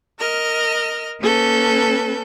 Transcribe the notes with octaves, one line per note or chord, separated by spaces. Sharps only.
A#4 D#5 F6
A#3 C#4 A4 B4 G6